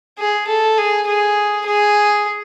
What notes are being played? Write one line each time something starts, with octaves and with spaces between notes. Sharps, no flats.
G#4
A4
G#4
G#4
G#4